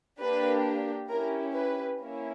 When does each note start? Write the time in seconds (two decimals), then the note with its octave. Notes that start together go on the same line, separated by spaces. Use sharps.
0.20 A#3 D4 G4 B4
1.10 C#4 E4 G4 A#4
1.55 B4
2.00 A#3 C#4 E4